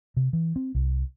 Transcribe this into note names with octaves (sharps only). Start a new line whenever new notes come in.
C3
E3
C4
C2